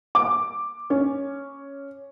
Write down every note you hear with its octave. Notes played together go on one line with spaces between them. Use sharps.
D6
C#4